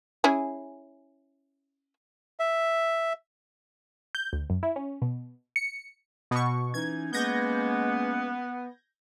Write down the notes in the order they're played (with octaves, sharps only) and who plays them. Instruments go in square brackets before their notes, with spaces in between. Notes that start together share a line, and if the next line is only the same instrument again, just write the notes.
[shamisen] C#4 E4 G#4
[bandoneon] E5
[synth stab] G6
D2
F#2
E4
C#4
B2
C#7
B2 C#6
[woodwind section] E3 C#4 D#4 [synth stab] G#6
[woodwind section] G#3 A#3 C#4 [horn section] B3 [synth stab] G6 G#6 A#6